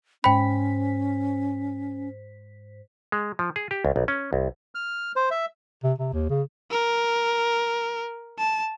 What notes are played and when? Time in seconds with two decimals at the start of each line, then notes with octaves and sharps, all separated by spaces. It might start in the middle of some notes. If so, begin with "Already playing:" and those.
0.24 G#2 C#4 C5 G5 B5 B6
3.12 G#3
3.39 F3
3.56 G#4
3.71 G4
3.85 C#2
3.96 B1
4.08 C#4
4.33 C2
4.75 F6
5.16 C5
5.31 E5
5.84 C3
5.99 C3
6.13 D#2
6.29 C#3
6.71 A#4
8.39 A5